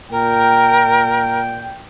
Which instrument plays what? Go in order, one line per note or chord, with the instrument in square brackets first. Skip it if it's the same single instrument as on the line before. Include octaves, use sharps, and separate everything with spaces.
[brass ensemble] A#2 G5 [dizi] A#4